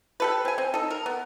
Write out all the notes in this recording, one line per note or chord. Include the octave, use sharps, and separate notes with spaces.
G4 A4 B4
C4 G#5
C4
D#4 A4
A#4
B3